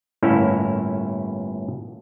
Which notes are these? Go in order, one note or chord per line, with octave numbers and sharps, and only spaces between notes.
G1 A2 A#3 C#4 E4 E5